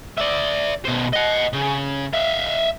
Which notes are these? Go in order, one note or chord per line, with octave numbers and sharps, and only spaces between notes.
D5 E5
B2 C5
D#5 F#5
C#3
E5 F5